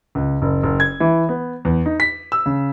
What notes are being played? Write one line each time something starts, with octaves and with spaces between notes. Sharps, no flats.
C#2
F#1
F#1
G#6
E3
B3
E2
D#4
B6
E6
C#3